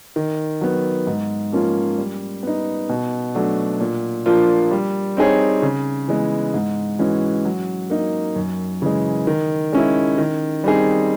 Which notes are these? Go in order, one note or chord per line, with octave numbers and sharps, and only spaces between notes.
D#3
F#3 B3
G#2
F3 A#3 C#4 F4
G3
B3 D#4
B2
F#3 A3 D4
A#2
F3 A#3 D4 F4
G3
C4 D#4 G#4 C#5
C#3
E3 G#3 B3
G#2
E3 G#3 C#4 F#4
F#3
A#3 D#4
F#2
C#3 E3 G#3
D#3
G#3 C#4 E4
D#3
G3 C4 D#4 G#4